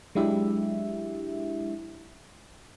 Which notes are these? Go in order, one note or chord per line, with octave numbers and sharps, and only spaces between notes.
F#3 G#3 D4 E4 G4 E5